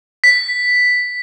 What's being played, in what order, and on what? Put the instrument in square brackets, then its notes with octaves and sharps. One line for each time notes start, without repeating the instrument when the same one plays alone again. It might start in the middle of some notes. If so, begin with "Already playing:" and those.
[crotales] B6